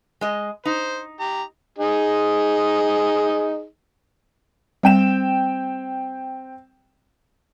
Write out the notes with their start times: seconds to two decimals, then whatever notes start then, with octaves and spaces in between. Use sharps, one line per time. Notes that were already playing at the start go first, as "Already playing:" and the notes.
0.21 G#3 D#5
0.65 D#4 C5
1.20 G4 A#5
1.78 D#4 G#4
4.83 G3 C4 G5 E7